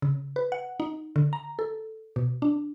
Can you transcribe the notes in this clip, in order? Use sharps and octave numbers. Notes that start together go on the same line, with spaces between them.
C#3
B4
F#5
D#4
D3
A#5
A4
B2
D4